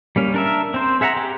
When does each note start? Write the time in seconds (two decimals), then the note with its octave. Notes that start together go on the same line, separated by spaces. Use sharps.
0.16 G3 A#3 C#4
0.34 D4 A#4 E5
0.74 C4 C5
1.01 G#4 E5 F#5 A5 A#5
1.17 G4